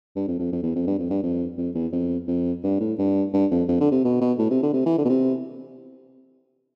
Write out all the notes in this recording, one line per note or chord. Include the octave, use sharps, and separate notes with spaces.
G2
F2
F2
F2
E2
F2
G2
F2
G2
F2
F2
E2
F2
F2
G2
A2
G2
G2
F2
F2
D3
C3
B2
B2
A2
C3
D3
C3
E3
D3
B2
C3